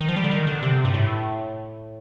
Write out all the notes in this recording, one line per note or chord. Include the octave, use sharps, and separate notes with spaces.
D#3
F3
G3
D3
D#3
D3
C3
G2
A2